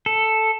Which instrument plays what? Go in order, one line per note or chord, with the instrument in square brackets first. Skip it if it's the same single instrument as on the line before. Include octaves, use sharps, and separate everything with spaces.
[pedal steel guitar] A4